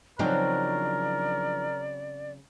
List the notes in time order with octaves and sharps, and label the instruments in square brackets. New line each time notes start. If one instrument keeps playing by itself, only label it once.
[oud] C#3 F#3 C4 [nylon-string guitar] F3 D4 D#4 [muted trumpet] A#4 [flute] D5